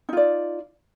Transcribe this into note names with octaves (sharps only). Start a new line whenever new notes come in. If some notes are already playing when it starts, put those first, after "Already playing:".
D#4 F4 D5